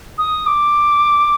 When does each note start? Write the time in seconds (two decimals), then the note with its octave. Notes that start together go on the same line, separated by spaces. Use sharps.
0.18 D#6
0.47 D6